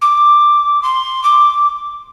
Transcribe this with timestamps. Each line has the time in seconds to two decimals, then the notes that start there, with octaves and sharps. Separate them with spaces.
0.02 D6
0.83 C6
1.24 D6